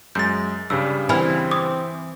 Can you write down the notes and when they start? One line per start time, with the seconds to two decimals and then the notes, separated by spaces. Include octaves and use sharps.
0.15 F#2 G#3 G6 A6
0.70 G2 C#3 G3 E6
1.09 E3 C4 G#5 B5 F6
1.51 D6 D#6